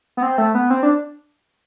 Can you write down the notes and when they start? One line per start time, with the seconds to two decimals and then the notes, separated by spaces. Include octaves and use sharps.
0.17 B3
0.23 C4
0.38 A3
0.55 B3
0.70 C4
0.83 D4